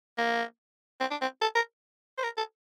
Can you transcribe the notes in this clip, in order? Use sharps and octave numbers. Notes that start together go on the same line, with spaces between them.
A#3
C4
D4
C4
A4
A#4
C5
A#4
A4